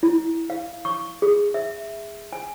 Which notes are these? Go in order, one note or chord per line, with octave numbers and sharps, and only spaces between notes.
E4
F5
C#6
G#4
E5
G#5